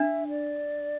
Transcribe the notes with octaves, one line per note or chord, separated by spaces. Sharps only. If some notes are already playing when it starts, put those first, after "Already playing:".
Already playing: D4 E5
D5